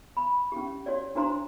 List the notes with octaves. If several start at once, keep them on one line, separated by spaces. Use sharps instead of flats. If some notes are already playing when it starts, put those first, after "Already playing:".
B5
C#4 G4
F#4 C#5 D5
D4 F#4 C5 A#5 C6